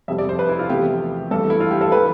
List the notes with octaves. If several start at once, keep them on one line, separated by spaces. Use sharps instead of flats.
F2 C3 G3 E5
D5
C5
B4
E4
F4
E2 C3 F3 A3 G4
G2 E3 A3 A4
E4
F4
G4
A4
E3 G3 B4